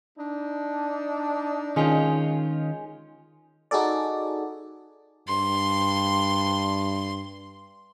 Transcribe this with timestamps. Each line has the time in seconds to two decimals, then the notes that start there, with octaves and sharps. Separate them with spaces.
0.17 D4 D#4
1.76 D#3 G#3 C#4 F4 D#5 G5
3.71 D#4 F#4 G#4 A4 D5
5.28 G2 C6